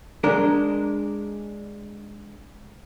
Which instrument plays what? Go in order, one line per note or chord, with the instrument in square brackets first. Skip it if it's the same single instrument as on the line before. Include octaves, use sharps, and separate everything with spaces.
[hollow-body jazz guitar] G#3 D4 A#4